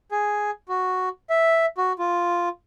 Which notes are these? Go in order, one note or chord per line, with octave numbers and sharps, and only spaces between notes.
G#4
F#4
E5
F#4
F4